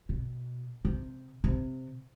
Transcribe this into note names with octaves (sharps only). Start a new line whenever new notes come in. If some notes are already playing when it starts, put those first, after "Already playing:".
B2
C3
C3